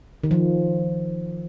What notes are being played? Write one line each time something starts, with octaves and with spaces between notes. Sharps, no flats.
D#3
F3